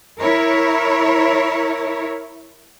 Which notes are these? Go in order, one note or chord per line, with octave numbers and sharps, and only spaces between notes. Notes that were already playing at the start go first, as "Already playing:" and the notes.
E4 A#4 C#5